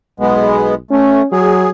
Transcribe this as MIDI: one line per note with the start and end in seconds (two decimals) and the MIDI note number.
0.20 0.78 35
0.20 0.75 56
0.20 0.75 59
0.91 1.22 57
0.91 1.26 61
1.32 1.70 54
1.32 1.70 68